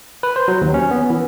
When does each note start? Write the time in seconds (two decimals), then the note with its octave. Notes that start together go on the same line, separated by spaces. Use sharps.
0.23 B4
0.36 C5
0.48 F#3
0.61 D#2
0.74 C#4
0.91 B3
1.10 E3